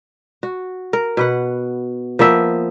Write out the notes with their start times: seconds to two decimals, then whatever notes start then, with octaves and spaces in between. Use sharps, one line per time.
0.43 F#4
0.93 A#4
1.17 B2 B4 F#5
2.19 F3 A#3 B3 E5